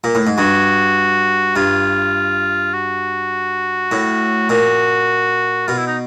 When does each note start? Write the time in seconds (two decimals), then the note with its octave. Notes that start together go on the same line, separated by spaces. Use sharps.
0.04 A#2
0.15 A2
0.27 G#2
0.38 G2 F#4
1.56 G2 F4
2.74 F#4
3.92 A2
4.49 A#2 F#4
5.68 B2 F4
5.77 E4
5.87 D#4